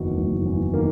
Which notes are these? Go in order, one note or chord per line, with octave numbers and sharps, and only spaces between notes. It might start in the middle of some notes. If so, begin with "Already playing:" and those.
Already playing: F#1 E2 D#3 F#3 F#4
F#1
E2
D#3 A#3